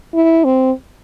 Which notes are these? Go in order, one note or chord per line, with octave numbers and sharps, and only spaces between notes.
E4
C4